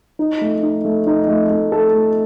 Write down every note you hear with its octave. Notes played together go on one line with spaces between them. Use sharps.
D#4
A3
D#4
A3
D#4
A3
A3
A4
A3